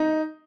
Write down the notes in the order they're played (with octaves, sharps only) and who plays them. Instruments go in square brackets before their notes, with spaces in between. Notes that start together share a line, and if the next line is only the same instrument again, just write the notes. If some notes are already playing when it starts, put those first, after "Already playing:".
Already playing: [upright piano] D#4